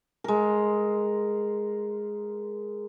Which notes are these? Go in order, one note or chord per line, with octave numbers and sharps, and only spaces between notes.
G#3 A#4